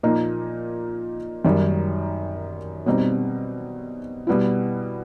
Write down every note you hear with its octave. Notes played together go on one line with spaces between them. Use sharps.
A#2 F3 A#3 D#4
F#2 D#3 G3
B2 G3 C4 D#4
B2 G3 B3 E4